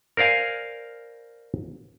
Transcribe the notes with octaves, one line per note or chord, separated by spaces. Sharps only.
A#4 C5 D5 F5 G#5